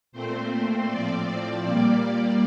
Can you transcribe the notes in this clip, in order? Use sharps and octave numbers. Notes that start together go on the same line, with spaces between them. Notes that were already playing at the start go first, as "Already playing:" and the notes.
A#2 A3 C4 C5
A2 F3 C4 D5
A#2 G3 A#3 D5